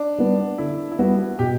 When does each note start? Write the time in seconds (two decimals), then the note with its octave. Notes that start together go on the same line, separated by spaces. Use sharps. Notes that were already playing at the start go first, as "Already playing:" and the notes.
Already playing: D4
0.19 G3 B3
0.58 D3 E4
0.92 E4
0.99 G3 B3 F#4
1.39 B2 G4